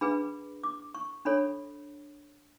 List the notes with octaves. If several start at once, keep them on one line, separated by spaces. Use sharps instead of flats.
D4 G#4 B4 B5
D6
C#6
D4 A4 C#5 B5